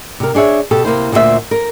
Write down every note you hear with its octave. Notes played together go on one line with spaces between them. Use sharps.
C3 A#4
D4 G#4 C#5 E5
B2 G4 A4
C3 A#3 E4 C5
D2 A#2 D4 G4 C5 E5
A#4